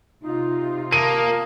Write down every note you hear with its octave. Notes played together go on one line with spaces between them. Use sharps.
C3 D#4 F4
A#3 F5 A5 D#6 D#7